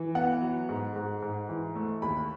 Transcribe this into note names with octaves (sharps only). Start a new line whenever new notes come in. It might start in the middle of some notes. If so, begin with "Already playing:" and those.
Already playing: E3
B3 F#5
F#3
G#2
G#2
G#2
E3
A3
D#2 B5